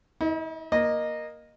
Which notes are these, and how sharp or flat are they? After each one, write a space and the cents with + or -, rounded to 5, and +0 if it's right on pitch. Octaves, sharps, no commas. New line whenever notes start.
E4 -45 D#5 +0
A#3 +10 D#5 -10